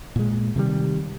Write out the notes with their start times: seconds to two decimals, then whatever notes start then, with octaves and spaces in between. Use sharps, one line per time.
0.16 A#2 G#3
0.56 C3 D#3 F3 G3